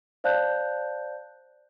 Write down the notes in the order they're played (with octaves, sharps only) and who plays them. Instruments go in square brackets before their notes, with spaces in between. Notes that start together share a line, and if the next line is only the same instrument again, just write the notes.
[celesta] C5 D5 F5 A5 F#6 G6